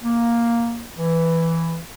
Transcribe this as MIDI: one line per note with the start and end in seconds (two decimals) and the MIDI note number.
0.03 0.85 58
0.98 1.78 52